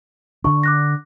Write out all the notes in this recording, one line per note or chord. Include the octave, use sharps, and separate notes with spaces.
D3 D4 C#6
D6 F#6 A#6